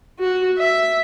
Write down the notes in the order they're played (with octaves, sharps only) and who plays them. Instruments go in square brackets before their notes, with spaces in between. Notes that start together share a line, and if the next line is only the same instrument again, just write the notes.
[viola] F#4
E5